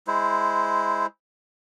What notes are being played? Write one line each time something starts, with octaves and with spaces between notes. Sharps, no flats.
G#3 E4 C5